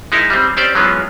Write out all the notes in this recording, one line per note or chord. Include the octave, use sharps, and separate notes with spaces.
G#3 D#4 E4 A#4
G3 C4
C4 C#4 G4 C5 D5
E3 F#3 G#3 B3 C#4 F4